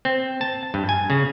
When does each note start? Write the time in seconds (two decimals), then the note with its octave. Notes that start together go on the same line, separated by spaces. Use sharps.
0.05 C4
0.41 A5
0.74 G2
0.89 G#5
1.10 C#3